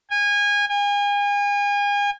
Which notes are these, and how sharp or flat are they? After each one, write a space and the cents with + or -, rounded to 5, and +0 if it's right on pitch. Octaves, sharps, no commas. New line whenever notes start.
G#5 -25
G#5 -35